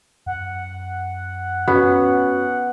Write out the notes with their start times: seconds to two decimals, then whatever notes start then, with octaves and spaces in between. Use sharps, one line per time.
0.26 F#2 F#5
1.68 B3 C#4 F#4